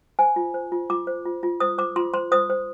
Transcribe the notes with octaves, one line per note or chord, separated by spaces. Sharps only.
C5 G#5
F4
C5
F4
F4 D6
C5
F4
F4
C5 D#6
C5 D6
F4 C6
C5 C6
C5 D#6
C5